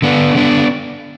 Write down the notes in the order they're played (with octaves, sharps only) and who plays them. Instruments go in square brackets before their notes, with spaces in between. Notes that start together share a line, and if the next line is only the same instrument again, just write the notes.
[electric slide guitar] D3 B3 D4
D3 B3 D4